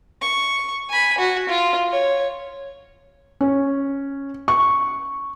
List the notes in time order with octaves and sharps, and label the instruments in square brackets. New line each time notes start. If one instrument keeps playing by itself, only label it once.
[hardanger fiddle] C#6
G#5 B5
F#4
F4
C#5
[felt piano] C#4
C#6